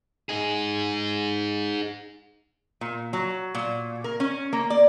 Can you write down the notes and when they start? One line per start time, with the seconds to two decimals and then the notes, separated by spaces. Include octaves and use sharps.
0.29 D#4 G#4
2.81 A#2
3.13 F#3
3.55 A#2
4.04 A#4
4.20 C#4
4.53 A#3
4.70 D5